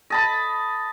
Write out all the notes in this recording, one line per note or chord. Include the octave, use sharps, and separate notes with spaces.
D#5 A5 B5